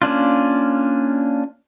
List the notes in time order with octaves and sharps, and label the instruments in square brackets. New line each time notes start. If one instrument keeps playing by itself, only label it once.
[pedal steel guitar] A#3 C#4 D4 F4